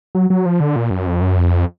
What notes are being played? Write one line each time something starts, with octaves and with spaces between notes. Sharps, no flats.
F#3
F#3
F3
D3
A#2
F#2
F2
F#2
F2